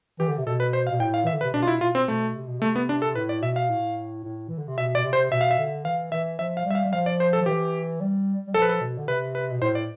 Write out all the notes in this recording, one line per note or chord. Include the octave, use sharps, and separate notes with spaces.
E3 G4
D3
C3
B2 A4
B4
C5
F5
B2
A2 G5
F5
E3 E5
D3
B4
C3
B2 D4
F4
E4
B2 F4
C4
B2 A3
C3
B2
C3 A3
B3
D4
A4
A2 B4
D5
B2 E5
F5
A2
A2
E3
D3
C3
B2 E5
B2 D5
C3
C5
B2 E5
F5
E5
D3
E3 F5
E3 E5
F3 E5
F5
G3
E5
F5
G3
F3 F5
D5
C5
A4
F3
E3 G4
G3
G3
F3 A4
B4
A4
B2
D3
C3 B4
B4
B2
A2 C5
D5